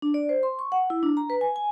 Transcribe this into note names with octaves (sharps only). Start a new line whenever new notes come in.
D4
D5
C5
C6
C#6
F#5
E4
D4
A#5
B4
G#5
G#5